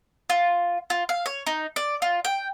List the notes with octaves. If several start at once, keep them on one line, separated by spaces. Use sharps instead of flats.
F4
F4
F5
C#5
D#4
D5
F4
G5